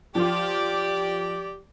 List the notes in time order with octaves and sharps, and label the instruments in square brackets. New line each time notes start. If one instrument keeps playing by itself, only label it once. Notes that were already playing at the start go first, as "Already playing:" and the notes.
[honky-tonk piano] F3 F4 [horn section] G4 [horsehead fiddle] D5